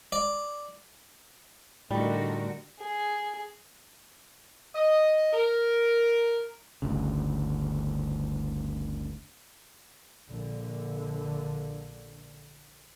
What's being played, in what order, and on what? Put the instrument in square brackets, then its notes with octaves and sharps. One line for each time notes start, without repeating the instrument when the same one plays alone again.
[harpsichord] D5
[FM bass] A2 [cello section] D3 F#4 A#4 [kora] G3 [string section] A3 D4 D#4
[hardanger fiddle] G#4
[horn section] D#5
A#4
[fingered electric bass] G1 D2 C#3
[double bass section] A#1 D3